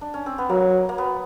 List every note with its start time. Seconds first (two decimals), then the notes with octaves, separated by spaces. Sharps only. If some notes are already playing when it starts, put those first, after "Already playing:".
0.01 D4
0.14 C#4
0.26 C4
0.38 B3
0.49 F#3 A#3
0.89 A#3
0.98 B3